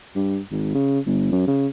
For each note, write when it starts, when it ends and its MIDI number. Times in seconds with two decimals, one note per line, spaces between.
0.16 0.39 43
0.51 0.71 32
0.75 1.00 49
1.07 1.32 31
1.32 1.47 42
1.48 1.67 49